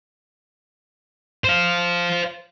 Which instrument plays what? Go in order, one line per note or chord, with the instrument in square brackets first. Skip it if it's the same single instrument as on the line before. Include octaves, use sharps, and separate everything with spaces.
[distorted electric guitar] C5 F5